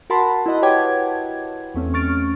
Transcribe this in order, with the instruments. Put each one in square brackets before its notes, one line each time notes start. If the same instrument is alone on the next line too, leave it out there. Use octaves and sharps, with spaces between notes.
[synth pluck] F#4 A#4 F#5 A5 B5 C6
E4 F#4 D#5 F#5
G4 B4 C#5 G5 D6 G#6
E2 A3 C4 C#4
C#6 F6 A6 D7